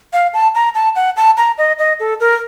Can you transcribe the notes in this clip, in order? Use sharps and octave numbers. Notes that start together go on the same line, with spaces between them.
F5
A5
A#5
A5
F#5
A5
A#5
D#5
D#5
A4
A#4